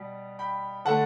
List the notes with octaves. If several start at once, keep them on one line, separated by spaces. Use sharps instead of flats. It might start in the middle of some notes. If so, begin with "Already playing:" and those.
Already playing: B2 G3
G5 B5
D3 A3 F#5 A5